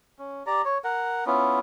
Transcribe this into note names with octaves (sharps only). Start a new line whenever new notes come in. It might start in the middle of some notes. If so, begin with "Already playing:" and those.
C#4
G4 D5 A#5
C#5
A#4 F#5
B3 C#4 E4 F4